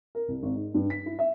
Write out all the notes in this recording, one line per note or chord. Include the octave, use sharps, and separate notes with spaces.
A#4
C2
G#1
G#2
G2
B6
E4
E5